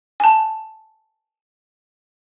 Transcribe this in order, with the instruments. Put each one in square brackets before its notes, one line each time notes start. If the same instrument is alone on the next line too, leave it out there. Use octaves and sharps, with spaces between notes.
[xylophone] G#5 A5